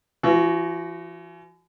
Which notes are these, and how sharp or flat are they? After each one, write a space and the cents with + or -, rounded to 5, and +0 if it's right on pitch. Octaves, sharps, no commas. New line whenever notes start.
E3 +45 F#4 +0